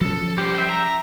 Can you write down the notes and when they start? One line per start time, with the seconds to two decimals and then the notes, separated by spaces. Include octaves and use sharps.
0.01 F3 C#4 A4
0.38 G3 G4 C5
0.55 E5 G5
0.69 A#5